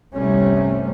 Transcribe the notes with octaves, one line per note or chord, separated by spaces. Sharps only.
G1 C2 C3 G3 A3 C#4